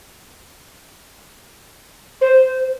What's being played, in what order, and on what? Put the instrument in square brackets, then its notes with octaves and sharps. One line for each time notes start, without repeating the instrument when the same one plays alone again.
[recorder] C5